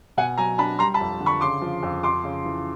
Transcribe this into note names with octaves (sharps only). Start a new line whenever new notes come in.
B2 F#5 G#5
F#3 G#5 A#5
D4 A5 B5
G3 A#5 C6
A5 B5
F2
D3
B5 C#6
C#3 C6 D6
F3
F2
F2 C6 D6
C#3
E3